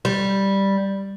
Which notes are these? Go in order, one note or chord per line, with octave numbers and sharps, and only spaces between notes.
G3